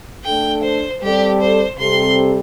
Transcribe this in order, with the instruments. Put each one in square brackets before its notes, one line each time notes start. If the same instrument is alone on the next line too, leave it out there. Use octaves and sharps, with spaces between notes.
[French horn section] A3 D4 A4 [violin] G5
[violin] C5
[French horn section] G3 C4 A4 D5 [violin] G4
[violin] C5
[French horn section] C3 G3 C4 A4 [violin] C6